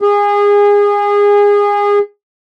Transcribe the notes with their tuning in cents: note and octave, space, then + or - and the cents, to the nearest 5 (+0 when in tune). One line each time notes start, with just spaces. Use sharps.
G#4 -25